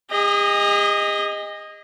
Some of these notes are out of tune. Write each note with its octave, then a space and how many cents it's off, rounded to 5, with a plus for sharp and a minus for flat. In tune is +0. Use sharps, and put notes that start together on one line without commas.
G#4 -45 D#5 +0